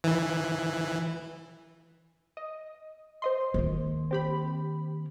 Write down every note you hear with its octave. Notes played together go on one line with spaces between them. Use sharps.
E3
D#5
C5 D#5 C6
D#3 A#3
C4 G4 B5